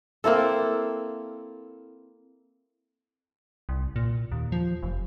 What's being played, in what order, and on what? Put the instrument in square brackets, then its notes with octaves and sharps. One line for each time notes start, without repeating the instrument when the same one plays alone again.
[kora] A#3 C4 E4 A4
[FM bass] C2
A#2
D#2
F3
F1